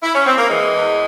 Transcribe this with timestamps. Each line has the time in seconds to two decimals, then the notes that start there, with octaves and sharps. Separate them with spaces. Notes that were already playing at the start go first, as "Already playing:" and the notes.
0.03 E4
0.15 C#4
0.27 C4
0.38 A#3
0.50 E3 G#3
0.73 E2